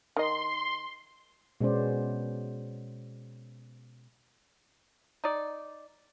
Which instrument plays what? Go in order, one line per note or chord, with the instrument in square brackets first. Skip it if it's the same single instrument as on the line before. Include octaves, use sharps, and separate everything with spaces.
[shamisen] D#3 D#5 [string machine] C6
[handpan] B2 G#3 B3 C#4 C5 D5
[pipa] D#4 D5